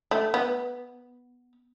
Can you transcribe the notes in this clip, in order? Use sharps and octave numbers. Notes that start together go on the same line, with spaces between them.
A3
B3